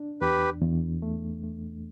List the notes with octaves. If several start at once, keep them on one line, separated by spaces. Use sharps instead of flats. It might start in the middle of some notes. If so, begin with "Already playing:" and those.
Already playing: D4
E2 G4 B4
E2
A3
A3